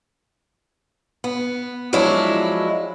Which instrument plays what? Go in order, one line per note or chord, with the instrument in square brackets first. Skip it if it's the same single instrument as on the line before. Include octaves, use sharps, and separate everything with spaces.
[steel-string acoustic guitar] B3
F3 F#3 G#3 D4 E4